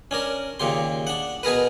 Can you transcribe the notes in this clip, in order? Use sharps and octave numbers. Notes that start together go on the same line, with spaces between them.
C#4 D4 A#4
D#2 A#2 C#3 G4 C6
D4 F#5
B2 G#4 A#4 B4